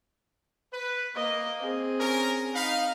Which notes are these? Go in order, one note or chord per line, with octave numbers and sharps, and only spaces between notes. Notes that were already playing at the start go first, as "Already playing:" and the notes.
B4
A#3 D#5
C4 G#4
C#4 A#4
D#4 F5 B5